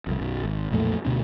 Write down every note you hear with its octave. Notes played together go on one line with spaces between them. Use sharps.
C2 F2
B1 F#2
G#1
B1 F2 A#2 A3
D2 B2 B3 D4